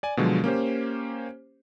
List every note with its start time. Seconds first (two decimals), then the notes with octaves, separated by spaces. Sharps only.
0.03 D5 G#5
0.17 B2 D3 F3 F#3 G#3
0.44 A#3 C#4 G4 C5